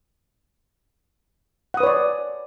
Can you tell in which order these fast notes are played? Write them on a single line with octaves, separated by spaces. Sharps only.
F#5 D#6 B4 C#5 D5